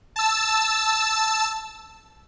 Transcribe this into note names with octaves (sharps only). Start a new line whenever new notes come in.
A5 E6